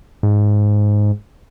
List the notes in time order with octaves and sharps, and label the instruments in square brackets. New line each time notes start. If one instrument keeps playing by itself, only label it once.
[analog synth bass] G#2